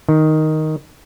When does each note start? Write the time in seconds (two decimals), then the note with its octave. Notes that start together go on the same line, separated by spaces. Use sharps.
0.09 D#3